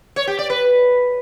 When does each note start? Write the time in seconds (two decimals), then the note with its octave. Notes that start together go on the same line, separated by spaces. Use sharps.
0.16 C#5
0.27 G4
0.39 D5
0.50 B4